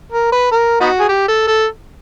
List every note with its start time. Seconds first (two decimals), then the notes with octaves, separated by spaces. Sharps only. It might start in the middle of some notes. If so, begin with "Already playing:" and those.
0.12 A#4
0.32 B4
0.52 A#4
0.80 B3 D#4 F#4
0.99 G#4
1.09 G4
1.28 A4
1.47 A4